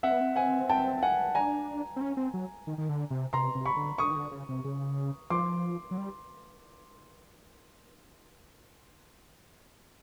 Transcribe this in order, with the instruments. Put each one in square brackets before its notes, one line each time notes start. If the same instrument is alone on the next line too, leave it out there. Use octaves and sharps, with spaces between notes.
[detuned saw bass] C4 [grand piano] E5 F#5
[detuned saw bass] B3
C4
[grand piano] F#5 G#5
G5 A5
F#5 G#5
[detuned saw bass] D4 [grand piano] G#5 A#5
[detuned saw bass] C4
C#4
C4
F#3
D#3
D#3
D3
C3
[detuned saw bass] C3 [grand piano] A#5 C6
[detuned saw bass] C3
[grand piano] B5 C#6
[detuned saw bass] D3
[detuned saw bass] D3 [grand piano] C#6 D#6
[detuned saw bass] D#3
D3
C#3
C3
C#3
[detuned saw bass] F3 [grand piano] C6 D6
[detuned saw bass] F#3
G3